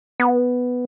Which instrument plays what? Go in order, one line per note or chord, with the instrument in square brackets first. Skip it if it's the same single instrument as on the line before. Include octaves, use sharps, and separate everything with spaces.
[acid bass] B3